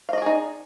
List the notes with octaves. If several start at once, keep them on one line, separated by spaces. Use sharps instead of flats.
D#4 G#4 D5 D#5 F5